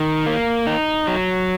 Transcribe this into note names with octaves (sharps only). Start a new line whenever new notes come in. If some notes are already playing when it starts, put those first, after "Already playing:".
Already playing: D#3
A#3
D#4
F#3